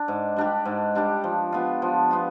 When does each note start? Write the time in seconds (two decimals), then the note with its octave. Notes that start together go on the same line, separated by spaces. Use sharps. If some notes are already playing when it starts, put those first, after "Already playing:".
Already playing: D4
0.08 G#2
0.36 G3 D4 G4
0.65 G#2
0.95 G3 D4 G4
1.24 F3
1.52 B3 F4
1.82 F3
2.11 B3 F4